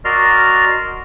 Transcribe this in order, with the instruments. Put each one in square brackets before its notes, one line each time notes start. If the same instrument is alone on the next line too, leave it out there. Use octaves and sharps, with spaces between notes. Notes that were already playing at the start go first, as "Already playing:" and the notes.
[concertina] F#4 A#4 D5 D#5 C6 F6